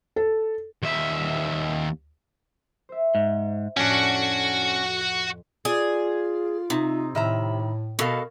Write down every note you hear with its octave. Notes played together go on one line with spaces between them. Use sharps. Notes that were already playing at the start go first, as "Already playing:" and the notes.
A4
D#2 E5
C5 E5
G#2
F2 A2 C#4 D4 F#4 F#5
F4 G#4 D5
C3 D#4
A2 D#3 E5 A#5 B5
B2 F#4 A4 A#4 F5